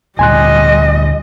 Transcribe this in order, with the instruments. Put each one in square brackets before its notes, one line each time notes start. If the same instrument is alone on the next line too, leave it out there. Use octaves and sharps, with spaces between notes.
[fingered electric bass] D2 A#2 D3 [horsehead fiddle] G3 D#5 [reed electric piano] G#5 C6 F#6